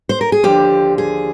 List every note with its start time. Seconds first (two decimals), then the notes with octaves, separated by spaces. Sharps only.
0.09 C5
0.21 A#4
0.32 G#4
0.43 D#2 D3 F3 G4
0.98 G#4